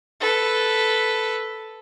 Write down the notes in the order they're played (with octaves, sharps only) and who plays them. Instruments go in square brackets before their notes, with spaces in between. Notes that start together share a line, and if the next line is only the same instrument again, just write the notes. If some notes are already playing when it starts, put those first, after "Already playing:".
[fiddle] A4 B4